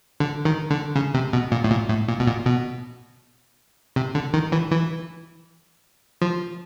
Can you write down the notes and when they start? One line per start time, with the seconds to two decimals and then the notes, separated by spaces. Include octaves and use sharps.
0.20 D3
0.45 D#3
0.70 D3
0.96 C#3
1.14 C3
1.33 B2
1.52 A#2
1.64 A2
1.71 A#2
1.89 A2
2.08 A#2
2.20 B2
2.27 A#2
2.46 B2
3.96 C3
4.15 D3
4.34 D#3
4.52 E3
4.71 E3
6.22 F3